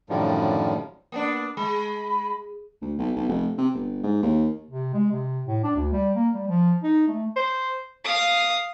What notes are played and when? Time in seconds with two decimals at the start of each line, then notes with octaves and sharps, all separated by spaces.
0.10 F#2 A2 D3 D#3 F3 G3
1.12 A#3 B3 D4
1.57 G#3 B5
2.82 D2
2.98 B1
3.16 B1
3.29 F1
3.58 C3
3.74 G1
4.03 G#2
4.23 D#2
4.71 C3
4.94 G#3
5.12 C3
5.47 A2
5.64 D4
5.77 D2
5.93 G3
6.16 A#3
6.34 G3
6.48 F3
6.83 D#4
7.08 A3
7.36 C5
8.05 F5 D#6